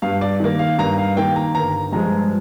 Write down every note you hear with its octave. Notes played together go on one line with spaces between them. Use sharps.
G2 F5
D5
D#3 A#3
F5
G2 A#5
F5
D#3 A#3 G5
A#5
G1 A#5
G2 F3 G#3 A#5